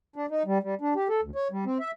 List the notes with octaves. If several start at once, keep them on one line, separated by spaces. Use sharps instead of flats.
D4
D#4
G3
G3
D4
G4
A4
D2
C#5
G3
C4
E5